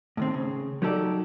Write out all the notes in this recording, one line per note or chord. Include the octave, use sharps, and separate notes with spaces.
A2 D#3 C4
C#3
F#3 D#4 G4 A4 D5